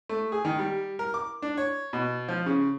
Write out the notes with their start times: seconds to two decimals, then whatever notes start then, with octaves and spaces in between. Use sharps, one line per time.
0.09 A3
0.32 G#4
0.45 D#3
0.59 G3
0.99 A#4
1.14 D6
1.42 D4
1.57 C#5
1.93 B2
2.28 F3
2.46 C#3